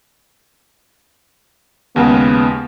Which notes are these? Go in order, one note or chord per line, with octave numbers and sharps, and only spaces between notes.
D#2 C#3 G#3 B3